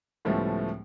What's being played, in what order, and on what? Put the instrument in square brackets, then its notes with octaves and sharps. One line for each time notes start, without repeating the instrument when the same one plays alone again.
[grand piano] C#2 A2 F3 G3 A3 B3